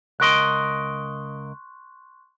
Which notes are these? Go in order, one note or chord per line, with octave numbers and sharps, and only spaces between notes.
C#2 A#4 D#5 C6 C#6 F#6